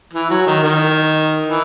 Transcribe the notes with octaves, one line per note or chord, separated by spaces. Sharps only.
E3
F#3
D#3
D#3
E3